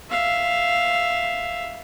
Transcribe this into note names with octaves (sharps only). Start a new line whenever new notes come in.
E5 F5